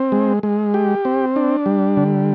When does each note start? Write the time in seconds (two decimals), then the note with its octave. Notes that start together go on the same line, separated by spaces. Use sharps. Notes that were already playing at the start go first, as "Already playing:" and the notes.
Already playing: C4
0.12 G#3
0.43 G#3
0.74 G4
1.05 C4
1.36 D4
1.66 G3
1.97 D3